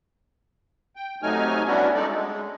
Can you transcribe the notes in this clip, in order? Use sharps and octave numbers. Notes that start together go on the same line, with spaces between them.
G5
C3 F#3 A3 D#4 G#5 F6
G3 B3 C#4 D4 E4 F#4
G#3 D#4 A4 D5
G#3